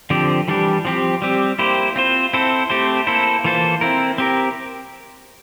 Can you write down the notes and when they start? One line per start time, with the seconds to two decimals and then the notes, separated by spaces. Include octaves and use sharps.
0.10 D3 F3 C4 G4
0.48 E3 G3 D4 G4
0.85 F3 C4 G4
1.22 G3 C4 G4
1.59 A#3 E4 G4 C5
1.96 C4 F4 C5
2.33 C4 E4 A4 C5
2.70 A3 C4 G4 C5
3.07 A#3 E4 A4 C5
3.44 E3 A#3 F4 A4 C5
3.81 C4 E4 A#4
4.18 C4 G4 A#4